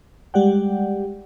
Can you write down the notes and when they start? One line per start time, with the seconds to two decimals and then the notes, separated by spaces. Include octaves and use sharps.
0.34 G3 G#3 G4 D5 F#5 G5